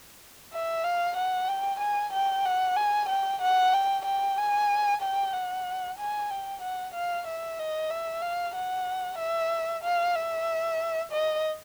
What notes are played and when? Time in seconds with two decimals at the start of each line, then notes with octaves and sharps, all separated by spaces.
0.53 E5
0.84 F5
1.17 F#5
1.49 G5
1.80 G#5
2.13 G5
2.45 F#5
2.77 G#5
3.09 G5
3.42 F#5
3.74 G5
4.05 G5
4.37 G#5
5.01 G5
5.33 F#5
5.99 G#5
6.31 G5
6.62 F#5
6.94 F5
7.27 E5
7.59 D#5
7.91 E5
8.22 F5
8.55 F#5
9.19 E5
9.84 F5
10.15 E5
11.12 D#5